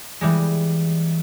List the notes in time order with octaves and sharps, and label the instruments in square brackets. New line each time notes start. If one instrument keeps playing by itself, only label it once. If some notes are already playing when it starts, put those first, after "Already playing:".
[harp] E3 G3 G#3